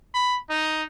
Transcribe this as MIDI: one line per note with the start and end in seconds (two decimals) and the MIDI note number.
0.14 0.38 83
0.50 0.84 63